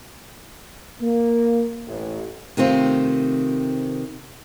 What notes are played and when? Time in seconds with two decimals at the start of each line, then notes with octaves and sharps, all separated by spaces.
1.01 A#3
1.87 A1
2.57 C3 D#3 A3 C4 F4